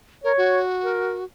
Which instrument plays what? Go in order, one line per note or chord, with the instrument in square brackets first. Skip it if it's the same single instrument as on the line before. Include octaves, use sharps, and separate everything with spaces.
[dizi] A#4 [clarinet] C#5
[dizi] F#4
[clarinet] A#4